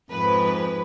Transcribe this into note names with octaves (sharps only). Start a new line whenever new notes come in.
F2 G#2 B4